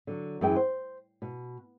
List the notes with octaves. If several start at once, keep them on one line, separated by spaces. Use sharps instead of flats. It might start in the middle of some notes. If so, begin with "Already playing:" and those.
D3 F#3
F#2 E3 G#4 B4 G5
C5
B2